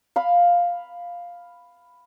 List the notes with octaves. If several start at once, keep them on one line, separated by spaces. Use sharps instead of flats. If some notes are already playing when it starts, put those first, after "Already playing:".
F5 B5